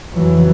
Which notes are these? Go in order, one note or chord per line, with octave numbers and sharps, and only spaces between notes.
F2 C#3 E3 F#3